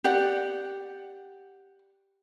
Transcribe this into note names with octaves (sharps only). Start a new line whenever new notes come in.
G4 D5 F#5